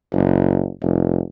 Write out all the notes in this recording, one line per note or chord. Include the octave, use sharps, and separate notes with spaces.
F#1
F1